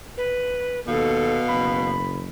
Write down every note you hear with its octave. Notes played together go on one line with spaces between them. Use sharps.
B4
D#2 B2 A4 F5
F#1 B5